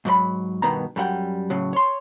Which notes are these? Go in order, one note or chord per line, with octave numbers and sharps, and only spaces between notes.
G#2 F#3 C5 B5
G2 B2 D#3 B3 A#5
F#2 G3 F#5 G5
A2 C#3 F#3
C#5 C6